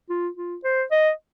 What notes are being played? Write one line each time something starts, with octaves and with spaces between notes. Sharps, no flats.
F4
F4
C5
D#5